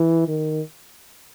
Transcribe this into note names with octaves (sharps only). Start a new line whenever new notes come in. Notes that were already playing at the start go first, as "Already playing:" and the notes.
Already playing: E3
D#3